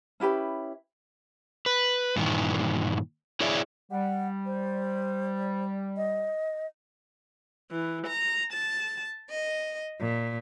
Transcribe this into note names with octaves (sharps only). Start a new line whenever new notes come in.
C#4 E4 G4 B4
B4
G2 A#2 D#3 E3
E4 G#4 C#5 D5 E5
G3 F#5
C5
D#5
E3
A#5
A5
D#5
A#2